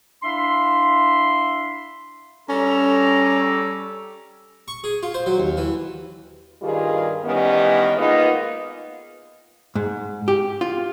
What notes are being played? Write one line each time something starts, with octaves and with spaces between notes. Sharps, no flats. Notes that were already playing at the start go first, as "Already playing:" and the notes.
D4 E4 E5 F5 C6
G3 C#4 G4 A4 A#5
C#6
G#4
F4
C5
F#3
D#2
E3
G2 D#3 G3 F4 G#4
D#3 E3 G3 B3 C#4
G#3 A#3 B3 D#4 F4
G#2
G4
F4